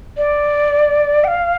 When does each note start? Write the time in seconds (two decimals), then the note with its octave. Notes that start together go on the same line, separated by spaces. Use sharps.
0.17 D5
1.24 G5
1.28 F5